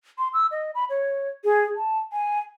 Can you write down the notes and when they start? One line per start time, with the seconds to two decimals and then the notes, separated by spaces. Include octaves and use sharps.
0.18 C6
0.33 E6
0.51 D#5
0.75 B5
0.90 C#5
1.44 G#4
1.76 A5
2.13 G#5